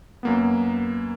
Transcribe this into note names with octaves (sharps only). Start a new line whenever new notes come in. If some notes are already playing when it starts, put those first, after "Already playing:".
F#2 A#3 B3